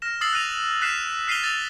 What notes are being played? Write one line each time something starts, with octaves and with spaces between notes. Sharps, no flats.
F6 A#6 E7
D#6 E6 A6 C7 F#7
F#6 A#6 D#7 F7
F6 F#6 B6 C7 E7
F6 B6 C7 D#7 F7 G7
E6 A6 D#7 F7 G7